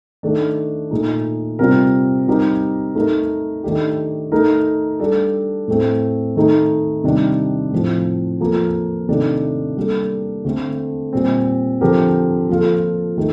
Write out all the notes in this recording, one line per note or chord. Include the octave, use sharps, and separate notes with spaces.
D#3 A3 D4
A#2 A3 D#4
C3 G3 C4 F4 A#4
G3 C4 D#4 G4 A#4
A3 D#4 A#4
D#3 A3 D4 G4
A3 D#4 A#4
G3 D4 A4
A2 A3 C4
D#3 A3 D#4
C3 D#3 G3 D4
A2 F3 C4
F3 A#3 F4 A4
C3 D#3 A3 D4
G3 A#3 D4 A4
D3 A3 C4
A#2 G3 C4
D3 F3 C4 G4 A#4
F3 A#3 F4 A4
D#3 A3